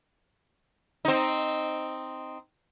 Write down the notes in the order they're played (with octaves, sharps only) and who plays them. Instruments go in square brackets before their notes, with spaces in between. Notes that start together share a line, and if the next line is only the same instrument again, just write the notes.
[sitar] C4 D#4